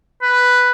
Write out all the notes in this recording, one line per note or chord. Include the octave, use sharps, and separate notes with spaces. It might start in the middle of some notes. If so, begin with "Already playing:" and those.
B4